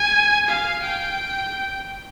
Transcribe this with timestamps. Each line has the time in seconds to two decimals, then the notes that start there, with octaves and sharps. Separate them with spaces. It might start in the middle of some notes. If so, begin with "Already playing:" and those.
Already playing: G#5
0.48 F5
0.82 G5